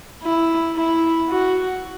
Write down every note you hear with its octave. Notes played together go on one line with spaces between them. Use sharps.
E4
E4
F#4